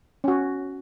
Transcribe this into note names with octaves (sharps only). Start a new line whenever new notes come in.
C#4 F#4